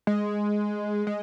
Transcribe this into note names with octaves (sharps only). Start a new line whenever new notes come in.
G#3
G#3